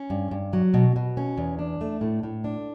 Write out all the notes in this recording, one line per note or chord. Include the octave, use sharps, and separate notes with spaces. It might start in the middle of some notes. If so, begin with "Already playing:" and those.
Already playing: C#4
G2
G2
F#3
B2
B2
C#4
E2
D4
A3
A2
A2
D4